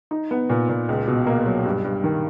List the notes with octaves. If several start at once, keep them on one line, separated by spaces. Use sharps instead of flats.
D#4
B3
A#2
A#2
C#2
B2
A#3
F#3
G2
G2
D#3